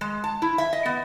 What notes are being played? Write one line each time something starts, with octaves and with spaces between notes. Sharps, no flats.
G#3
A5
E4
E5
D#5
B3